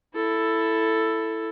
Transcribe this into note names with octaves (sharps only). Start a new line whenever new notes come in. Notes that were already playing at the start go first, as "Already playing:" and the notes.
E4 A4